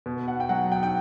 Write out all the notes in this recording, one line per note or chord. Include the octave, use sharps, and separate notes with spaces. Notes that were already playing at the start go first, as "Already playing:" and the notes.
B2
F#5
G5
F#3 F#5
G5
G5